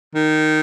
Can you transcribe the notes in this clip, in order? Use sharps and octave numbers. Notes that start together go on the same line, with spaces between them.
D#3